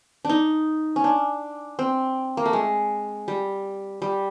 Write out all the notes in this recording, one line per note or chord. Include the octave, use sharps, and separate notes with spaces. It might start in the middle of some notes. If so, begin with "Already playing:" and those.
D4 D#4
C#4
D4
C4
A#3
A3
G#3
G3
G3